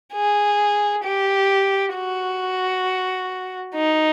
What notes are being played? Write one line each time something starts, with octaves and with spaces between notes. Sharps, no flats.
G#4
G4
F#4
D#4